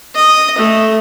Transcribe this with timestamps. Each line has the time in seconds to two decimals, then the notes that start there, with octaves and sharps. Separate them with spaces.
0.16 D#5
0.58 A3